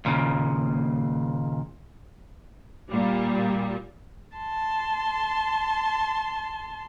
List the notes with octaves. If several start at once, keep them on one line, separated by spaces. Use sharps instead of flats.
D#2 A#2 C#3
A#2 G3
A5 C6